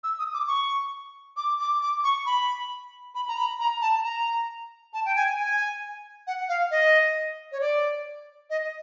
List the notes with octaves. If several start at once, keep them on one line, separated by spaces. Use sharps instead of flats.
E6
D#6
D6
C#6
D6
D6
D6
C#6
B5
B5
A#5
B5
A#5
A5
A#5
A5
G5
G#5
G#5
F#5
F5
D#5
C#5
D5
D#5